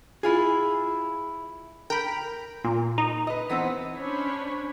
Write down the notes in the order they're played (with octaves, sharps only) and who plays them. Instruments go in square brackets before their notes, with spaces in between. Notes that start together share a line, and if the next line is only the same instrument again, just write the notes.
[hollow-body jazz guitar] E4 F4 G#4
[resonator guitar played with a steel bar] A#4 [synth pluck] G5 B5
[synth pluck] A#2
D#4
[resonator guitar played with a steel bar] B4 D#5
E3 B3 C4
[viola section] C#4 D4 C5 C#5 B5